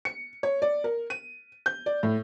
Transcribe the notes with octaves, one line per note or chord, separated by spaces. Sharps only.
C#7
C#5
D5
A#4
D#7
G6
D5
A2